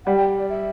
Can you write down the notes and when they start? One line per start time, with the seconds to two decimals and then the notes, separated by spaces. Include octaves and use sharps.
0.05 G3 F#5
0.16 G5
0.38 D5
0.49 E5